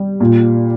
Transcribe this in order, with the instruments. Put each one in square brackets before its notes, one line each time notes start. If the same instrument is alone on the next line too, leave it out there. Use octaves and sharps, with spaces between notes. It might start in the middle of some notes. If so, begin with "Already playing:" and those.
Already playing: [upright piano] G3
A#2